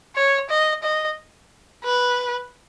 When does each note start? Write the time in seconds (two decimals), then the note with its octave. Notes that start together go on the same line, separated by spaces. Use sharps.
0.15 C#5
0.49 D#5
0.83 D#5
1.84 B4